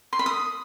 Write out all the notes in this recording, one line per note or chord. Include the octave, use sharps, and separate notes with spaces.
C6
B5
D#6